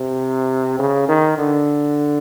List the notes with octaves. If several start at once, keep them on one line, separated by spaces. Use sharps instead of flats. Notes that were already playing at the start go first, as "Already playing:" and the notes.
Already playing: C3
C#3
D#3
D3